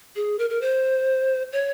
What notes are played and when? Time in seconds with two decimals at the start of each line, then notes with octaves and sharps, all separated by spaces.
0.16 G#4
0.39 A#4
0.50 A#4
0.61 C5
1.52 C#5